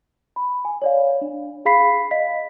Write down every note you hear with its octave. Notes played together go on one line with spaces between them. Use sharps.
B5
G#5
C#5 D5 F5
D4
G#4 F5 B5 B6 C7
D#5 F5 B6